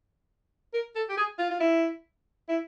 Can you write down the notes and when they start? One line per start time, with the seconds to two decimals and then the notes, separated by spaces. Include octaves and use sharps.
0.73 A#4
0.95 A4
1.09 G4
1.17 G#4
1.39 F4
1.50 F4
1.60 E4
2.48 E4